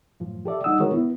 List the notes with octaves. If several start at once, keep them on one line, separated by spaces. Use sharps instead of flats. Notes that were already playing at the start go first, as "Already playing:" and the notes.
F#2 A2 F3
G4 A4 D5 E5
G3 D#4 F#5 D#6 E6
D3 D#3 G#3 F#4 A#4 C#5
B3 E4